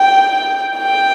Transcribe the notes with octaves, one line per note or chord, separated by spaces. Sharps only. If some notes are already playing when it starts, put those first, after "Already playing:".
Already playing: G5
G5